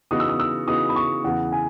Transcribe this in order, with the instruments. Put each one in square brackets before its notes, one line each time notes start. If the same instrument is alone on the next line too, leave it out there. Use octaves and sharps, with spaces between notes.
[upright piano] C#3 E3 B3 D#4 F#4 [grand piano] D#6
[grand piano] E6
D#6
E6
[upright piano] C#3 E3 B3 D#4 F#4 [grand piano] D#6
[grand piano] B5
C#6
[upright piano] E2 C#3 E3 [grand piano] F#5
[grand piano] G#5